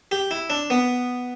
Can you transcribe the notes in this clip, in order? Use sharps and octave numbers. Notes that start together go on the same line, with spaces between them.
G4
E4
D4
B3